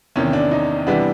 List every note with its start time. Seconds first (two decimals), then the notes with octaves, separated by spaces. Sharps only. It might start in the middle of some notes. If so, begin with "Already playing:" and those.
0.16 E2 C3 D#3 C#4
0.33 D4
0.51 D#4
0.87 C3 E3 G3 B3 D4